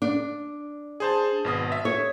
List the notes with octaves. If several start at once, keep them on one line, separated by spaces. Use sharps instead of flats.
D4
G#4 C5 A5
G#1 B2 D#6
E5
C#5